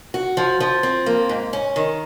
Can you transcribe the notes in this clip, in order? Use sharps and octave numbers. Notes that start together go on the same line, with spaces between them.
F#4
F3
F3
C4
A#3
G#2
C#4
D#3